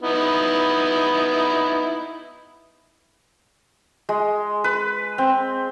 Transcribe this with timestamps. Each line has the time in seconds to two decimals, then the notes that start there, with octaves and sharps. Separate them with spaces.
0.02 B3 D#4 E4
4.09 G#3
4.64 B4
5.18 C4